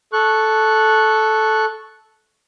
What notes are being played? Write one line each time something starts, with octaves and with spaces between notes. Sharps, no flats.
A4 C#6 F#6